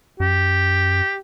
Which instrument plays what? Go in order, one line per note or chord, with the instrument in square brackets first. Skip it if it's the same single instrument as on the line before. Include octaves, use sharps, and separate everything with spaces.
[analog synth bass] F#2 [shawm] G4